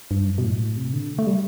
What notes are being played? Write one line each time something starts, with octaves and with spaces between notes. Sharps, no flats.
G2
F#2
B2
A2
C3
D3
A3
G3